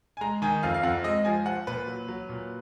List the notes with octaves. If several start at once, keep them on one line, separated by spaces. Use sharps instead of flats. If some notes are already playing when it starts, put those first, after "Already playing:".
G#5
G#3 A#5
D#3 G#5
F2 F5
F5
F2 F#5
G#3 D#5
F3 G#5
F3 F#5
A#2 B4
F#3
F#3
A#2